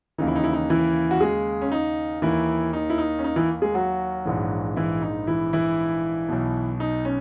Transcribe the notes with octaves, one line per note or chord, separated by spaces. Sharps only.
D#2 C#3 E3 D#4
E4
D#4
E4
D#4
E3 E4
F#4
G#3 G#4
C#4
D#4
D#2 D#3 E3 E4
D#4
E4
D#4
C#4
D#4
E3 E4
G#3 G#4
F#3 F#4
A#1 G#2 E3
E3 E4
D#4
E3 E4
E3 E4
B1 B2
D#4
C#4